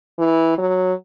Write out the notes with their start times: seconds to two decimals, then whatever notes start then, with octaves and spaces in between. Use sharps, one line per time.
0.19 E3
0.58 F#3